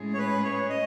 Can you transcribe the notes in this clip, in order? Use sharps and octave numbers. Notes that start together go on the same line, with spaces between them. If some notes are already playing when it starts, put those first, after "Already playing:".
Already playing: A2 G#3 C#4 G#4
C#5
B4
C#5
D#5